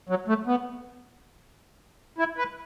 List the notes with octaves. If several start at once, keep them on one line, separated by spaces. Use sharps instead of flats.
F#3
A3
B3
E4
B4